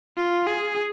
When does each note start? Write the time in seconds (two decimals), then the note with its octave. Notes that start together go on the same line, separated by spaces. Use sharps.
0.17 F4
0.46 G#4